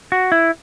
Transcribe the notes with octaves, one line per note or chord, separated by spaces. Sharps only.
F#4
E4